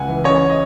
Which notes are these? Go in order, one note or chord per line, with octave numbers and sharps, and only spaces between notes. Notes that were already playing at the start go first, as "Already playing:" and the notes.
Already playing: C#2 F#5 G#5
E3
C#3 C#5 D#5
D#5